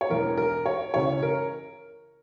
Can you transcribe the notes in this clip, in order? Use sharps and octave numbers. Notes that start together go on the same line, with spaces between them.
C#5
E1 E2 E3 A#4
A#4
C#5
C#2 C#3 E3 C#5
A#4